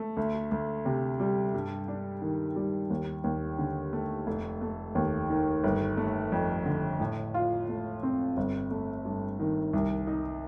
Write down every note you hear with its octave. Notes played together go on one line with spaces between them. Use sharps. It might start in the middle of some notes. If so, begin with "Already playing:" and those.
Already playing: A3
D2
D2
C3
G3
G2
D4
D#3
G3
D#2
D#2
D3
A3
F1
A3
D#2
D#3
G1
A3
F2
D3
A2
F4
A3
C4
G1
A3
G2
D#3
C2
D#4